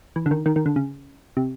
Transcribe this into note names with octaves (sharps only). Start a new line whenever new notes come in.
E3
D3
D#3
D#3
D#3
D3
C#3
C3